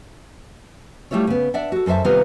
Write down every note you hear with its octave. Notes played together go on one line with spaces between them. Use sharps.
G3 A3 E4 F4 C#5
C#3 B3
D4 D5 E5 F#5
F#4 A4
F#2 A4 C5 E5 A5
C3 D#3 G3 B3 F4 A#4